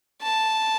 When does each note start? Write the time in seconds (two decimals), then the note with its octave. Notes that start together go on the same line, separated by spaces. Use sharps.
0.23 A5